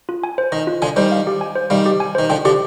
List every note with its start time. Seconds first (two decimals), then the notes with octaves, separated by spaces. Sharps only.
0.09 F4
0.23 G#5
0.38 C5
0.52 D#3 D#5
0.67 F4
0.82 D3 F3 G#5
0.96 D#3 G3 C5
1.12 F5
1.27 G4
1.41 G#5
1.55 C5
1.70 D#3 G3 F5
1.86 G4
2.00 G#5
2.15 D#3 C5
2.30 D3 F3 G5
2.45 D3 F3 G4